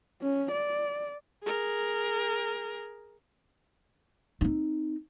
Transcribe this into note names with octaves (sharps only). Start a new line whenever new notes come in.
C#4
D5
G#4 A#4
C4 D#4